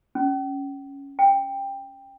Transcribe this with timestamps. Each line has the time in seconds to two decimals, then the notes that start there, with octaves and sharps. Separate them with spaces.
0.15 C#4
1.19 G5